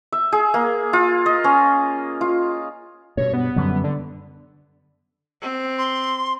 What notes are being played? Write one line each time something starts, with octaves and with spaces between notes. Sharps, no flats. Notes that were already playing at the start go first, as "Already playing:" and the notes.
E5
G#4
A#3
F4
D#5
C#4
F4
G2 B2 C#5
B3
F#2 D3 G3
D3
C4
C6